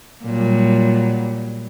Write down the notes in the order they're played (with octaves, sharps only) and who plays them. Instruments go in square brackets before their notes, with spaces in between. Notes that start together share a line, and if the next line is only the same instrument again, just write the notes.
[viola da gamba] A#2 F#3 G3